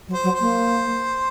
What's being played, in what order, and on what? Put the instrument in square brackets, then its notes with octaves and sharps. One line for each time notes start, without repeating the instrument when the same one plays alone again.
[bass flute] F#3
[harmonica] C5
[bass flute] F#3
[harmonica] C5
[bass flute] A#3